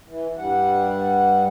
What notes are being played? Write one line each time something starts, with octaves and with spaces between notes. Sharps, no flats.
E3
G2 G3 F#5